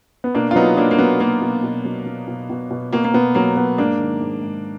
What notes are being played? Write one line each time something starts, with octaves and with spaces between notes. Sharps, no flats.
B3
B2 A#3 D4
F4
F#3 B3 D#4
F#3 A#3 D4
A#3
F#3 B3
F#3 A#3
B2
B2
F#3
F#3
B2
B2
B2
B2 A#3
A#3
B2 B3
F#3 A#3
F#3 B3
G#2 A#3 D4
D#3
G#2
G#2